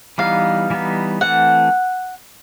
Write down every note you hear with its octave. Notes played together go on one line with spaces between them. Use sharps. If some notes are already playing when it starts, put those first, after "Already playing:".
E3 G3 B3 D#4 F5
E3 G3 B3 D#4
E3 A3 C4 F#5